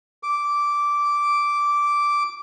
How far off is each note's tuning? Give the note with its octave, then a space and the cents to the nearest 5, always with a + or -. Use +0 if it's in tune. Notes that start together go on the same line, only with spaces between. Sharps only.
D6 -10